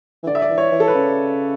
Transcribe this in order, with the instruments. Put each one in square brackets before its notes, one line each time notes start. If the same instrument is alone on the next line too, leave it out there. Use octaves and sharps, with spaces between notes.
[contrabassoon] E3
[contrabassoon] D3 [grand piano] D5
[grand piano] E5
D5
[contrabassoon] E3
[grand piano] C#5
[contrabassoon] E3
[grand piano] A4
B4
[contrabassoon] C#3